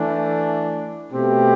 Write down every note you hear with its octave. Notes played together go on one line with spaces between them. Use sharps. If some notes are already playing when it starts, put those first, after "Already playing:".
Already playing: E3 A3 D4
B2 A3 C4 G4